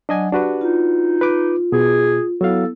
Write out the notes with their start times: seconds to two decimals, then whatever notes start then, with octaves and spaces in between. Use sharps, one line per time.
0.09 F#3 D4 D#5 F#5 G#5
0.32 D4 F#4 G4 B4
0.61 D#4 F4
1.21 B4 D6
1.72 B2 G#4
2.41 F#3 B3 E4 A4 F5